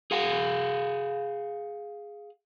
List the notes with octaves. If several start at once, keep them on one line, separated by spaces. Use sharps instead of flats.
G#4 F5 F#5